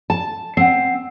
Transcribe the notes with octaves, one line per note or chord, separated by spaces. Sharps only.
A5
C4 F#5 C7